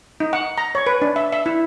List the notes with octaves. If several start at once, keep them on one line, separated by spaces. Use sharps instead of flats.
D#4
F#5
A#5
C#5
B4
D4
E5
E5
E4